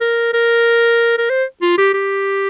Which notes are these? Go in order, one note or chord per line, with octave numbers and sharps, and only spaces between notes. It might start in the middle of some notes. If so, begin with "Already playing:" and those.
A#4
A#4
A#4
C5
F4
G4
G4